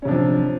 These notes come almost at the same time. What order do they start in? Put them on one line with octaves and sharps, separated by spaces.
C#4 C3 D4 F3